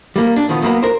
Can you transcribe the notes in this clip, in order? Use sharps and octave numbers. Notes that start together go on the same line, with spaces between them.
G3 A#3
D4
D#3 F3 B3 D#4
F#2 A#3 B3 A#5
A#4 C5